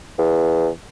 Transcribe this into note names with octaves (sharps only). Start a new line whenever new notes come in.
E2